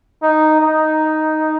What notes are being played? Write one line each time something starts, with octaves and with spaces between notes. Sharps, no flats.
D#4
D#4